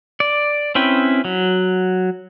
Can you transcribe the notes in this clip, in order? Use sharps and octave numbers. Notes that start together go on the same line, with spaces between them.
D5
C4 C#4 E4 B4 G5
F#3